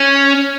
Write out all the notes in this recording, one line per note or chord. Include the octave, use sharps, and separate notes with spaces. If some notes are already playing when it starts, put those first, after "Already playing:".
Already playing: C#4